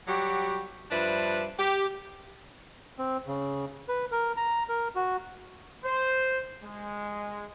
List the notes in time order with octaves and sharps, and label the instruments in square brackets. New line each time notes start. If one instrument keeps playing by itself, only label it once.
[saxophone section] F#3 G3 F#4 G4
G2 F3 D4 B4 E5
G4
[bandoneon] C4
C#3
B4
A#4
A#5
A#4
F#4
[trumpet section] C5
G#3